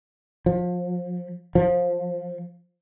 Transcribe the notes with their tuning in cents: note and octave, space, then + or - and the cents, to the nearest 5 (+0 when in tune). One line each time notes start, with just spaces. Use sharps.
F3 +30
F3 +15